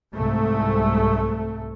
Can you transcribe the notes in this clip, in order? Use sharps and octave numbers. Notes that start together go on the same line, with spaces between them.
C2 G#2 A3